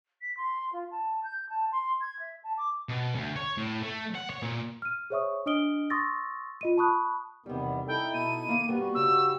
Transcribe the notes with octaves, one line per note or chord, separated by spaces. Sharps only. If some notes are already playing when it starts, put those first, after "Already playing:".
B6
C6
F4
A5
G6
A5
C6
G#6
E5
A5
D6
B2
D2
C#5
A2
A3
F#5
C#5
A#2
F6 D#7
G#4 C5 C#5 E5 C#6 D#6
D4 D#5 D#6 F6 D7 G7
C6 C#6 D#6 E6 A6 A#6
F4 D#5 D#7
A5 B5 C#6 D#6 F#6
E2 C3 D#3 G3 B3
D#4 E4 A4 G5
B2 D#7
D#3 A#3 F5
G2 G3 A#3 B3 F#4
G2 C#3 E6